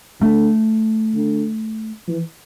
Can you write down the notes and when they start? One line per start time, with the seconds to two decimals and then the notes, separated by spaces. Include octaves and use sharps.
0.20 D3 A3
1.15 D3
2.07 E3